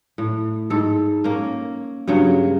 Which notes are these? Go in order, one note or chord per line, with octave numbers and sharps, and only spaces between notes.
A2
G#2 A4
A#3 C#4
G2 C#3 F#3 C#5